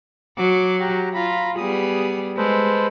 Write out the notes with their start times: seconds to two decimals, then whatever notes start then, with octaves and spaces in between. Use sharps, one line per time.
0.38 F#3 D6
0.80 F#4 G4 A#5
1.14 F4 A#5 B5
1.58 G3 B3 G#4 D#6
2.37 G#3 A4 B4 C5